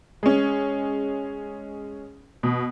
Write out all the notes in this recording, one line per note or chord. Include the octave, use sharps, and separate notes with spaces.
G#3 C#4
B2